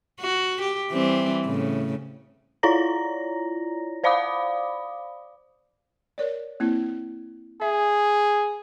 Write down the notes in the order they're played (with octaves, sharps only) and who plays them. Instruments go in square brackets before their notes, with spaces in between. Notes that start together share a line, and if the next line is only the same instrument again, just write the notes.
[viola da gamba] F#4
G4
E3 G3 C4
A2 C#3
[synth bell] E4 F4 C#5 D5 A#5 A#6
C5 D5 F5 B5 D6 D#6
[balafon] A#4 C#5 D5
A#3 C4 E4
[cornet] G#4 [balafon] E5